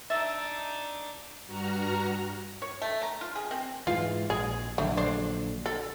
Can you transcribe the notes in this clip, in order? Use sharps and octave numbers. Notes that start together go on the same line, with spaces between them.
D4 D#4 E5 A6
G2 F#4 A#5 F6
C#5
A3
A#5
F4
G#4
C4
G#2 E3 F4
A#1 G#4
A#1 D3 F#3 A3
D4 C5
A4